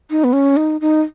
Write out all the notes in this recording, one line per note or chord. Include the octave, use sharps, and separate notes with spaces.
D#4
B3
C#4
D#4
D#4